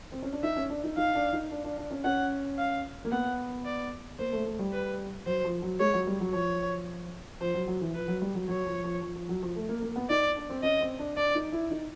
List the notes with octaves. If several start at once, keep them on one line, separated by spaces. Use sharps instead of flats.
C4
C#4
D4
D#4 E5
C#4
D4
D#4
D#4 F5
D4
D#4
D4
D4
D4
C#4
C#4 F#5
F5
A#3
B3 F#5
D5
A#3 C5
A3
A3
G3
B4
F#3 C5
F3
F#3
G#3 C#5
F#3
G3
F#3
F3 C#5
F3 C5
F#3
F#3
E3
F3 B4
F#3
G3
F#3
F#3 C#5
F3
F3
F3
F3
F#3
F3
A3
A#3
A#3
B3
D#4 D5
D4
C4
C#4 D#5
C4
D4
D4 D5
D#4
E4
D#4